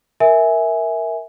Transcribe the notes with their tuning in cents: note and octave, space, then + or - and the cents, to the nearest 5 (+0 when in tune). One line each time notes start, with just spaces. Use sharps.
A#4 +0 E5 -15 G#5 +0